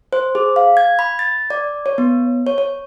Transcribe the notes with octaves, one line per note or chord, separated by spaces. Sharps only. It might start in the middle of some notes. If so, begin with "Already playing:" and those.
C5
G#4
F5
G#6
B5
A6
D5
C#5
B3
C#5
C#5